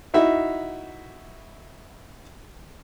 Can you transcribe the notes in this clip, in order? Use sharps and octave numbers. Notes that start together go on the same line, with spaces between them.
D#4 E4 F#4 E5